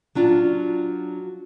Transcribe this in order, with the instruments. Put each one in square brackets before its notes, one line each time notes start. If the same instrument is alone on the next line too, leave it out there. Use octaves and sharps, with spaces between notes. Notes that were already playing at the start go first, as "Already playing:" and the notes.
[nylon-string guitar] F#3 D4 F4